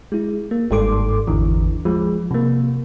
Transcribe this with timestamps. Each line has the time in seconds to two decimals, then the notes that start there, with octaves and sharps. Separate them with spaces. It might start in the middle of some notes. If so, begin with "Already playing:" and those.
0.12 G#3 E4
0.51 A#3
0.70 G1 G#2 G3 A4 C6 D6
1.27 G#1 E2 D3 E3
1.85 F3 G#3
2.31 C3 A#3